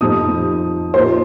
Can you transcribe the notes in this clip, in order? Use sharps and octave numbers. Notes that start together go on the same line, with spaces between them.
F2 F3 D#4 D#6
A#2 A#3 D#4 C5